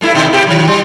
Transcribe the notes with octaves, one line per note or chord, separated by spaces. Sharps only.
G2 A3 E4
B2 D#3
B2 G4
D#3 F#3
G3